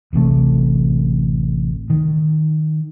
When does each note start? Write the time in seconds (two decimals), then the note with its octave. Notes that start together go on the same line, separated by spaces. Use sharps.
0.13 D1 A1 C3 A3
1.90 D#3